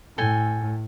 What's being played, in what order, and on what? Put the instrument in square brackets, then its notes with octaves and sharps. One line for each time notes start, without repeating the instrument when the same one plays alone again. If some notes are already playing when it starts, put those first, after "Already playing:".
[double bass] A2 [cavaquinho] A4 G5 G#5